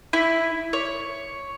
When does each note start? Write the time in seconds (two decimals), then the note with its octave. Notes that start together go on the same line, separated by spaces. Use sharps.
0.13 E4
0.73 C#5